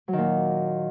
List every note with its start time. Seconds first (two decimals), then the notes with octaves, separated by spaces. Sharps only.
0.08 F#3
0.13 D#3
0.18 A#2